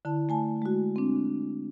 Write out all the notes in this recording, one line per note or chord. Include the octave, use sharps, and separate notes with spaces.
D3 E4 A5
A3 G#5 A5
G#3 F#4
C4 D4